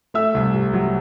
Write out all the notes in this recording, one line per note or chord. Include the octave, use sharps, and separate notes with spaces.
A3 E5 E6
C2
C3
F#3